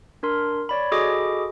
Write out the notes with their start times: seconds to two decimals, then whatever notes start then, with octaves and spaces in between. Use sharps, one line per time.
0.23 D4 A#4 C6
0.69 C#5 D5 B5
0.92 F#4 G#4 A4 D#5 B5 D6